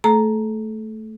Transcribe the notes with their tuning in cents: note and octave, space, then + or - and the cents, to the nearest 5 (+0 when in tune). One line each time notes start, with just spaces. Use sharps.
A3 +0 A4 -35 A#5 +0